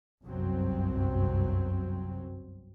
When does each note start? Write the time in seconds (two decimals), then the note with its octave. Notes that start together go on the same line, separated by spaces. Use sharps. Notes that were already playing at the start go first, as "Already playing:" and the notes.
0.24 G1 C2 F#2 F#3 C4